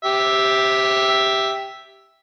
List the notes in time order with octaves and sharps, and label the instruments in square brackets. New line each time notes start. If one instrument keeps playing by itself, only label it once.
[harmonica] G4 E5